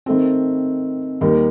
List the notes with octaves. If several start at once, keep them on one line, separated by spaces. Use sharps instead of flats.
D#3 A3 C4
D#2 D#3 G3